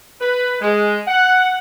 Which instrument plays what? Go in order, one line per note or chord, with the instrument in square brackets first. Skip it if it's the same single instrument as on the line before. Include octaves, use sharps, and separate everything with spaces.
[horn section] B4
G#3
F#5